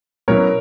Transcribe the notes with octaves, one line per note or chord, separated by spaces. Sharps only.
B2 F#3 C#4 E4 A#4 C#5